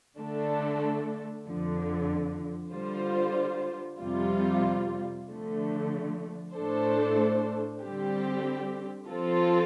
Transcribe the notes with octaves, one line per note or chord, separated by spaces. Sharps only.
D3 A3 D4 A4
F2 D3 F3
D3 G3 F4 C5
F2 C3 G3 F4
D3 F3 A3
A2 A3 D4 A4 C5
D3 G3 C4 G4
F3 C4 F4 A4